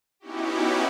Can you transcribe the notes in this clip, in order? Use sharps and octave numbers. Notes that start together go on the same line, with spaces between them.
B3 C#4 D#4 E4 F#4 G4